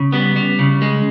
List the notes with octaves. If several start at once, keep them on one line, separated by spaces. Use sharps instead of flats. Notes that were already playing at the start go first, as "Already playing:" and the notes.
Already playing: C#3
G3 B3
G3
C#3
G#3